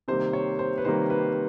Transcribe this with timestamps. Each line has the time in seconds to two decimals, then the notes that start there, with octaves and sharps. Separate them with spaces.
0.08 C3 D#3 G3 A#3 C5
0.33 C#5
0.59 C5
0.78 B4
0.85 C3 D#3 G3 A#3 C5
1.10 B4